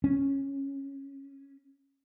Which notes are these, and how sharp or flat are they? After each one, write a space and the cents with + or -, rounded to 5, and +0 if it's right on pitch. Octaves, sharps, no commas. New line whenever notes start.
C#4 -10